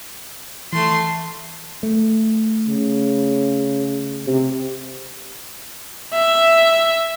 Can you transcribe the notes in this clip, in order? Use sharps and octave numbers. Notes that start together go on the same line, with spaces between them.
E3 A3 C6
A3
C#3
C3
E5